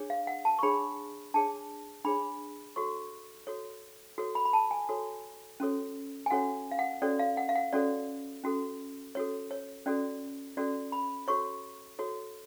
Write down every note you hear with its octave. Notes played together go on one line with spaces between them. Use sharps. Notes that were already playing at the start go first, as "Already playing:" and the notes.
Already playing: D4 G#4 C#5
F5
F#5
A5
C#6
D4 G#4 C#5 B5
D4 G#4 C#5 A5
D4 G#4 C#5 B5
F#4 A4 C#5 C#6
F#4 A4 C#5
F#4 A4 C#5
B5
B5
A5
G#5
F#4 A4 C#5
C#4 F#4 A4 C#5
G#5
C#4 F#4 A4 C#5 F#5
F5
F#5
C#4 F#4 A4 C#5 D5
F5
F#5
F5
F#5
C#4 F#4 A4 C#5 D5
C#4 F#4 A4
C#4 F#4 A4 C#5
C#5
C#4 F#4 A4 D5
C#4 F#4 A4 D5
B5
F#4 A4 C#5 C#6
F#4 A4 C#5